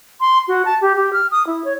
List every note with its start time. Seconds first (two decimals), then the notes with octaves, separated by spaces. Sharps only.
0.20 C6
0.48 F#4
0.65 A5
0.81 G4
0.96 G4
1.13 F6
1.31 D#6
1.47 E4
1.65 C#5